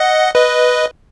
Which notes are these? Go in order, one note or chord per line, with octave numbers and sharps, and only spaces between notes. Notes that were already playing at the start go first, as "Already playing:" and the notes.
Already playing: D#5 F#5
B4 D#5